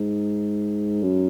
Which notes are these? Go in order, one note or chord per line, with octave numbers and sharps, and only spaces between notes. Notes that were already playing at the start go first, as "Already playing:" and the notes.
Already playing: G#2
F#2